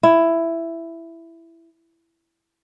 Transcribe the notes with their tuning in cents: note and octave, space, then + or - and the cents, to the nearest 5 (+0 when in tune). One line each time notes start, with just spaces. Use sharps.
E4 +10